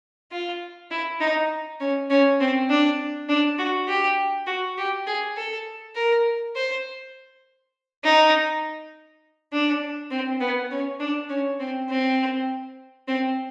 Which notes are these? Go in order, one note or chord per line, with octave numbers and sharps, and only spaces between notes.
F4
E4
D#4
C#4
C#4
C4
D4
D4
F#4
G4
F#4
G4
G#4
A4
A#4
C5
D#4
D4
C4
B3
C#4
D4
C#4
C4
C4
C4